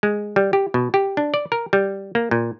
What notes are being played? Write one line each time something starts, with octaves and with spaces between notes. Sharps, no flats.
G#3
G3
G4
B2
G4
D4
D5
A#4
G3
A#3
A#2